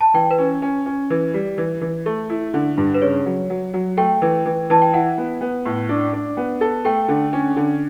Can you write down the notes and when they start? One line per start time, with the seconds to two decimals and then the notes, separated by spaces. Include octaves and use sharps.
0.01 A5
0.14 E3 G5
0.31 B4
0.38 C#4
0.62 C#4
0.86 C#4
1.10 E3
1.34 G3
1.58 E3
1.81 E3
2.06 A3
2.30 E4
2.54 D3
2.77 G2
2.94 B4
3.02 C#3 C#5
3.26 F#3
3.50 F#3
3.74 F#3
3.97 A3 G5
4.22 E3
4.45 E3
4.70 E3 A5
4.82 G5
4.93 E4 F#5
5.18 B3
5.41 B3
5.65 A2
5.89 D4
6.13 D4
6.37 B3
6.61 A4
6.85 A3 G5
7.08 D3
7.33 C#4
7.56 D3